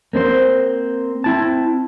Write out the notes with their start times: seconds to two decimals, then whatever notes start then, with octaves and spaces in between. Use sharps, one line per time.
0.13 A#3 C4 D4 C5
1.24 C4 E4 A5